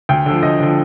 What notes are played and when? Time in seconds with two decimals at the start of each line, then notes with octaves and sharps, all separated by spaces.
0.09 D2 G5
0.26 D3 F3
0.43 D2 D#5
0.60 D3 F3